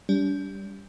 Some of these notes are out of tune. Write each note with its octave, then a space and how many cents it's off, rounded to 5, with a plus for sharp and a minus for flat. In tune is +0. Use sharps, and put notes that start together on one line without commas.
G3 +0 D4 -45